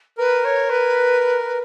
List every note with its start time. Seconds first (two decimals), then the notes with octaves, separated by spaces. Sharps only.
0.18 A#4 B4
0.44 C#5
0.69 B4